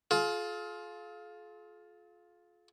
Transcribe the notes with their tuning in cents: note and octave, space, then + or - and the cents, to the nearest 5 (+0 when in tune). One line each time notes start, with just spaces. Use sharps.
F4 +10 G#4 +45